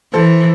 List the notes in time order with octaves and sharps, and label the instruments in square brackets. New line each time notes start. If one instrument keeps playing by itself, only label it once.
[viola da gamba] E3 [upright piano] A4 C5